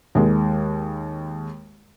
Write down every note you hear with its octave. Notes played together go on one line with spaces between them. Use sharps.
D#2 G#3